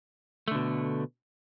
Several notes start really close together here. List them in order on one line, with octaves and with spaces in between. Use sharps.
A3 D3 B2